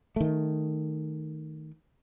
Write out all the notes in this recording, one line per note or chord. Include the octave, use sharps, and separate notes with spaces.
D#3 A3